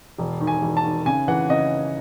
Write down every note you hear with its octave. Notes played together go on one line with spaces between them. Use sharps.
E1
D#3
G#5
E1
A5
D#3
C#3 G#5
E3 F#5
C#3 D#5